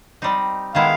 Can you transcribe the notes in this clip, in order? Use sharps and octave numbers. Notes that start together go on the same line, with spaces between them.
G3 C4 D#4
D#3 G#3 B3 E4 F5